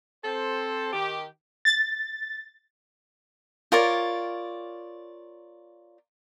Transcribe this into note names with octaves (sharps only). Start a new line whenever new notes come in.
C4 A4 C5
D#3 G4
A6
F4 A#4 C#5 D5